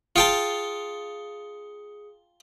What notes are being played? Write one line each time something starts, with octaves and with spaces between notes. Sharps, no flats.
F4 G#4 G5 A5 D#6 C#7